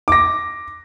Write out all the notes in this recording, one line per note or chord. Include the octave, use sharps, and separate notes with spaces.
D6 A#6